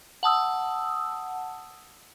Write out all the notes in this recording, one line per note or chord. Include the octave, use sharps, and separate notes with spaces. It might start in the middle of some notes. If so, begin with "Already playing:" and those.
F#5 A5 D#6 E6